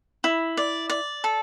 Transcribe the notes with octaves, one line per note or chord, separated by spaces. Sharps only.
E4
D5
D5
A4